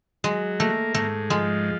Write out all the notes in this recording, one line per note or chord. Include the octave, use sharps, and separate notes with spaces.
F#3 G#3
A3 A#3
G#2 A3
F3 G#3